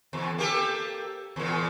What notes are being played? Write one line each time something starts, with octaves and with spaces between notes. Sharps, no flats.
E2
A#3 G4 A4
E2 A#2